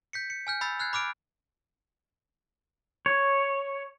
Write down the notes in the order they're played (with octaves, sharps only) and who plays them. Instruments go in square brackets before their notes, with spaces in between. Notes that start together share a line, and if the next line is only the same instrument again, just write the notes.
[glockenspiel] G6 B6 C#7
C#7
G#5 F6 G6
B5 E6 A6 C7
F6 F#6 G#6 C7
B5 D6 F6 D7
[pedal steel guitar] C#5